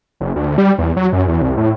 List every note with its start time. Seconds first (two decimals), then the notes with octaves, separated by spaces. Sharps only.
0.21 F#1
0.36 D2
0.58 G3
0.78 E2
0.96 F#3
1.13 F#2
1.28 E2
1.42 C2
1.57 A2